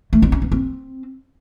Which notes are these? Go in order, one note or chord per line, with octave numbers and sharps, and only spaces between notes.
A3
C4
C#4
B3
C4